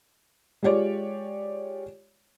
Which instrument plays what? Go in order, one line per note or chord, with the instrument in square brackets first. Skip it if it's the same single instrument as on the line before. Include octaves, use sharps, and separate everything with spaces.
[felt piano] G#3 F4 G4 C#5 D5